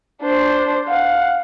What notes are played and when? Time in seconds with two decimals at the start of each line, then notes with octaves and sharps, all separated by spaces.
0.22 D4 C5
0.87 F5 F#5